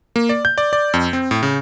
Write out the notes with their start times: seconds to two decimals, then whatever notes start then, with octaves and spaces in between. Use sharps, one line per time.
0.16 A#3
0.29 D5
0.45 G6
0.58 D5
0.73 D5
0.94 F2
1.13 C4
1.31 A2
1.43 C#3